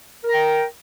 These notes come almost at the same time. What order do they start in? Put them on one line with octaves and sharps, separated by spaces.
A#4 A#5 G5